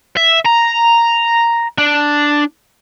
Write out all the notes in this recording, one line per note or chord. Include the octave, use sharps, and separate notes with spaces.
E5
A#5
D4